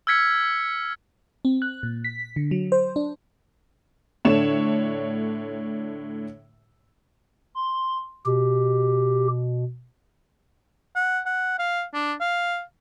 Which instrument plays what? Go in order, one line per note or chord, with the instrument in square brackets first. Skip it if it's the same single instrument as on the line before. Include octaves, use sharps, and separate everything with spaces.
[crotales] E6 F6 G#6 B6 C#7
[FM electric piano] C4
F#6
A#2
B6
D3
F#3
C5
D4
[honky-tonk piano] A2 D3 D4 C#5 E7
[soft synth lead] C6
[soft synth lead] B2 [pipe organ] G4
[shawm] F#5
F#5
F5
D4
F5